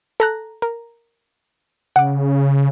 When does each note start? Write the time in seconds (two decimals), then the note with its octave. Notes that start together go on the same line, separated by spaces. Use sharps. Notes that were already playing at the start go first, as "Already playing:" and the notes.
0.20 A4 A#5 F#6
0.62 A#4
1.96 C#3 F#5 D6